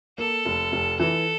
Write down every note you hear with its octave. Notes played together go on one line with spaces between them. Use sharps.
A#3 A4
F1
F1
E3 A4